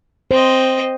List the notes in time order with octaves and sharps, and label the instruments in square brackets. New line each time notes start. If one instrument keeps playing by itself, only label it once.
[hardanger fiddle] C4 D#5 [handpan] C5